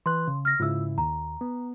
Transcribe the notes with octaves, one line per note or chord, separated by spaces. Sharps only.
E3 B4 C6 F#6
C#3
F6 A#6
G#2 C#3 E4 F4 E6
D#2 A#5
B3